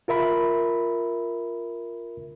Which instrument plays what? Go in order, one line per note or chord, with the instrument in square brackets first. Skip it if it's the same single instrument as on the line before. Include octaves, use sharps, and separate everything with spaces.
[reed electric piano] F4 A#4 E5 B5